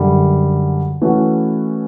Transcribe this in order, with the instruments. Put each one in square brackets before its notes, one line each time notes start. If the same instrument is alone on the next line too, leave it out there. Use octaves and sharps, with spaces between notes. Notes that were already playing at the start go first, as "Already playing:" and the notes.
Already playing: [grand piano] F#2 D3 G3
E3 A3 C#4 F#4